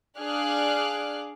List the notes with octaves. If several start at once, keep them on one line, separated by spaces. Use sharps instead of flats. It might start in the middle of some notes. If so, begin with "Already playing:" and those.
D4 G#4 F5 D6 F6 F#6